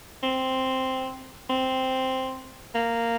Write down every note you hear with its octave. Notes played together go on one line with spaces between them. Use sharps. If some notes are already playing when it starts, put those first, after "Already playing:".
C4
C4
A#3